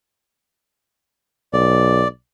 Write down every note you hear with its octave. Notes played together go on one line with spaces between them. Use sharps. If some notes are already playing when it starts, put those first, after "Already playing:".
B1 D5